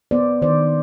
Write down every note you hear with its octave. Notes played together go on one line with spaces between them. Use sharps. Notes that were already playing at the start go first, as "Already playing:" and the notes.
B3 C5 D5
D#3 C5 D5